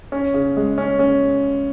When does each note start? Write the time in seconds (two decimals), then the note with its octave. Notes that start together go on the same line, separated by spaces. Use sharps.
0.12 C#4
0.34 C#3
0.57 G#3
0.78 C#4
0.99 C#4